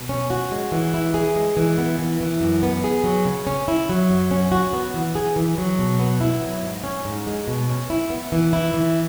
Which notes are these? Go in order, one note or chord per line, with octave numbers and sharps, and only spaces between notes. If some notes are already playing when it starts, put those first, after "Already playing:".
Already playing: B2
C#4
F#4
G#3
E3
E4
G#4
G#3
E3
B3
E3
E3
F#2
B3
G#4
F#3
C#3
C#4
E4
F#3
F#2
C#4
F#4
B3
E3
G#4
E3
F#3
B2
B3
E4
F#3
G#2
C#4
G#2
G#3
B2
C#4
E4
B3
E3
E4
E3